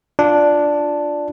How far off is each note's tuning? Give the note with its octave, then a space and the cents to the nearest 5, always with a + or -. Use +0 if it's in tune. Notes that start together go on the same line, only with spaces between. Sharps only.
D4 +0 F4 +0